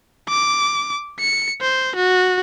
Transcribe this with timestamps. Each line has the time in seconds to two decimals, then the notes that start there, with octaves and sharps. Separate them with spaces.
0.29 D6
1.19 C#7
1.61 C5
1.95 F#4